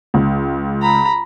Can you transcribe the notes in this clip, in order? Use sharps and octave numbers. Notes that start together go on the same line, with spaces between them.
C#2
A#5 B5